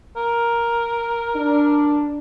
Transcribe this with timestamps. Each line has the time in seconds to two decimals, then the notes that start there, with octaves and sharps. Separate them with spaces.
0.16 A#4
1.36 D4